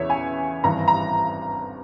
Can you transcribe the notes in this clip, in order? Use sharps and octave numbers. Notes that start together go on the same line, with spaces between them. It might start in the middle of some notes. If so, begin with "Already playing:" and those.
Already playing: E2 C#3 E3 C#5 E5
G#5
G#1 G2 E3 A#5
A#5